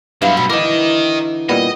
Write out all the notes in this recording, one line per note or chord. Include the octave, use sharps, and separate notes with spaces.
G2 F#3 B3 E4 F5
B2 B5
D3 E3 D#4 A#4 D#5 D6
A#2 G3 B3 D#5